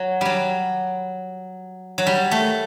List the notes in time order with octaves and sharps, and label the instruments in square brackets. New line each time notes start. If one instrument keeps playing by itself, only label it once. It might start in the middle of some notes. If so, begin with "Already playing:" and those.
Already playing: [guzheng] F#3
F#3 G3
F#3
G3
A3